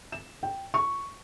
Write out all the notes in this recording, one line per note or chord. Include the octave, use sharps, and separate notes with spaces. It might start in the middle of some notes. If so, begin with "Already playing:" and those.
E7
G5
C#6